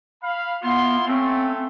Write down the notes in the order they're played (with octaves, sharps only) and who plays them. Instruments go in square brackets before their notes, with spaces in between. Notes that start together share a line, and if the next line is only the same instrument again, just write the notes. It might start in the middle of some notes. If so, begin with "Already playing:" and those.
[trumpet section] F5 B5
[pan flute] B3 [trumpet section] E4 F4 C6
[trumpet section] A3 C#4 [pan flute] C4